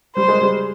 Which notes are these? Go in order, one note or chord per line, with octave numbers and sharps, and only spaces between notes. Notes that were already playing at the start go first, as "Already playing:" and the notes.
G3 C5
G#3
G3